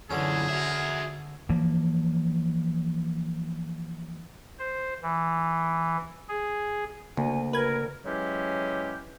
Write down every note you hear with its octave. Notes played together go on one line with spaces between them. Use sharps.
F#2 D3 E3 C#4 G#4
F#4 E5
E3 F3 A#3
C5
E3
G#4
D2 C#3 A#3 G#5
A#4 B4 G#6
C#3 E3 F#3 G#3 C#4 G4